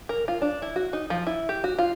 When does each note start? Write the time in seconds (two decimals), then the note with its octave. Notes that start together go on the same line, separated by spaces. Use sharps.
0.09 A#4
0.28 F4
0.42 D4
0.62 E4
0.76 F#4
0.93 D#4
1.10 F3
1.27 E4
1.49 G4
1.64 F#4
1.79 F4